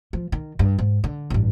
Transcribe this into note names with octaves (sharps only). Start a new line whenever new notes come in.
F3
D#3
G2
G#2
D3
A1 G2